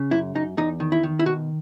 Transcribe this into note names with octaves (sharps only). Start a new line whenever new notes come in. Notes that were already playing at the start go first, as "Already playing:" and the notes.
Already playing: C#3
F#2 E4
F#2 D#4
E2 D#4
D#3
E4
D#3
E4
B2 F#4